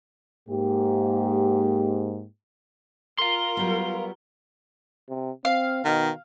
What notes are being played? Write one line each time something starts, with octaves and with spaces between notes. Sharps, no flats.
G#2 A#3 G4
F4 A#4 F5 C6 G7
F#3 G3 B3
C3
C4 F5
B2 D#3